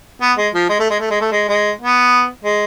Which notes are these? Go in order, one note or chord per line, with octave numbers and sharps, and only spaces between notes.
B3
G#3
F3
G#3
A3
G#3
A3
G#3
A3
G#3
G#3
B3
G#3